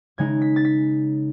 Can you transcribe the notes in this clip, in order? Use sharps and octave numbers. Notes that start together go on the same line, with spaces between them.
C#3 G#3 D#4 G#6
B6
A6
B6